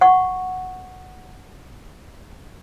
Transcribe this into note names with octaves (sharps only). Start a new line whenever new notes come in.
F#5 C#6